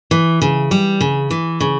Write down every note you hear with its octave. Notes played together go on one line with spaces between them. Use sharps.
E3
C#3
G3
C#3
E3
C#3